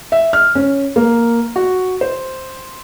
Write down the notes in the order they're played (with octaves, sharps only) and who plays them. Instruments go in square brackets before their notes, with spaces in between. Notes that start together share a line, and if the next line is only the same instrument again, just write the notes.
[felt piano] E5
F6
C#4
A#3
F#4
C5